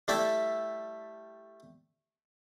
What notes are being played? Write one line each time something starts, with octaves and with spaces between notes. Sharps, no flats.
G3 A3 E4 D5 E5